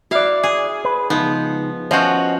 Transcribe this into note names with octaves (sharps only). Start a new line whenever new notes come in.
E4 F#4 D5 F5
G#4
B4
C#2 F3 B3 D#4
F3 C#4 F#4 C5 D#5 F#5